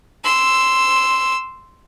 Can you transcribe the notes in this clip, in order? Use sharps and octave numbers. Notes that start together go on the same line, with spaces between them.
C6 E6